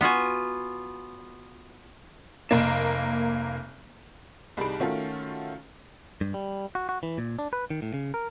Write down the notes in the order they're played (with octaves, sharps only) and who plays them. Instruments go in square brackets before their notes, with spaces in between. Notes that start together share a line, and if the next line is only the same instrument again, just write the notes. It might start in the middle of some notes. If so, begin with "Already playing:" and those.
[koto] B3 F4 F#4 G#5
[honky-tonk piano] F1 A#3 E7
C2 G3 D#4 G#4 B5 D7
D#3 A3 C#4 F4 F#4 A4
[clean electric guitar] G2
G3
F#4
F#4
E3
A#2
D4
B4
D#3
A2
C#3
A#4